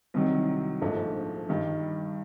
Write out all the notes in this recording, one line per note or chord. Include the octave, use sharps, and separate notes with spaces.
C2 C3 D#3 F#3
A#1 G#2 F3 A3 D4
G2 D#3 G3